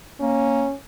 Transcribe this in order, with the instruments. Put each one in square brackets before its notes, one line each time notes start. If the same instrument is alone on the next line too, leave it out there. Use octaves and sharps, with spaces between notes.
[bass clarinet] A#3 [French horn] C#4